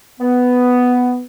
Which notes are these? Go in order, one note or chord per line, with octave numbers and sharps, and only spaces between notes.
B3